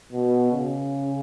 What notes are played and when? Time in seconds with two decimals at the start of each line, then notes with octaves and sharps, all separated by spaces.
0.12 B2
0.52 C#3